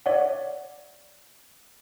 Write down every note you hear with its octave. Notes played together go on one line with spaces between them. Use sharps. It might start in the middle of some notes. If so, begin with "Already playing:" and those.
C#5 D5 E5 F#5